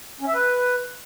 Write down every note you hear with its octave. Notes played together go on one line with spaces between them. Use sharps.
C#4
E5
B4